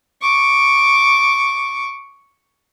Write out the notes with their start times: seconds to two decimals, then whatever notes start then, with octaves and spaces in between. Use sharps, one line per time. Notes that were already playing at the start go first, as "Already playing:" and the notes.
0.21 C#6 D6